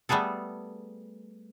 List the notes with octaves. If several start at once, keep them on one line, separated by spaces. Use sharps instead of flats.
G3 A3 B3 G#4 A4